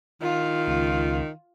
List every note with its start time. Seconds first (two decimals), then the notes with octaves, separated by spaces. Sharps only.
0.22 D#3 F4
0.67 C#2